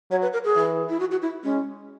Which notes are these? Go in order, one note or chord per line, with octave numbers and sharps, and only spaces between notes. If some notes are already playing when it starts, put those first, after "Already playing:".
F#3 C#5
B4
A#4
G#4
E3
E4
F#4
F#4
E4
G#3 C#4